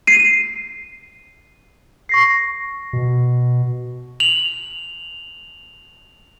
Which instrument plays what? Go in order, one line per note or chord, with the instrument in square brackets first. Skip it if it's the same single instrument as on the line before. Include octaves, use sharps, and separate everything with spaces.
[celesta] C7 D#7
C#6 A#6 C7
[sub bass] B2
[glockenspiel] F7 F#7